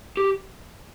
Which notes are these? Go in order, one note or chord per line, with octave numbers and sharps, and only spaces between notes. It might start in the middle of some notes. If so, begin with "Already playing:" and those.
G4